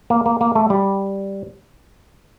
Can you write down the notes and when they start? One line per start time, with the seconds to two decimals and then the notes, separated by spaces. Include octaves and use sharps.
0.10 A#3
0.26 A#3
0.41 A#3
0.55 A3
0.70 G3